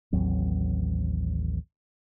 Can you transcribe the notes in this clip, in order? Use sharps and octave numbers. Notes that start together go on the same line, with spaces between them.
A1 D#2 F#3 C4